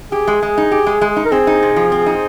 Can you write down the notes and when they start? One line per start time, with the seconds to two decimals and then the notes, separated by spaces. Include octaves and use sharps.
0.12 G4 G#4
0.27 G#3
0.42 G#3
0.57 D#4
0.72 G4
0.86 G#3
1.01 G#3
1.16 D#4
1.25 A#4
1.32 C4 G#4
1.47 D#4
1.63 C3
1.76 F3
1.92 C4
2.06 D#4